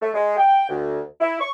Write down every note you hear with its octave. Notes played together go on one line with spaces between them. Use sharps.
A3
G#3
G5
D2
E4
C#6